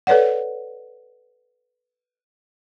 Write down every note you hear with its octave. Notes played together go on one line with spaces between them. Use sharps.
A4 B4 C#5 D5 F#5